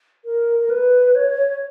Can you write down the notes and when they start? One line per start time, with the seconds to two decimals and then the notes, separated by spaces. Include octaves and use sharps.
0.25 A#4
0.60 A#4
0.70 B4
1.15 C#5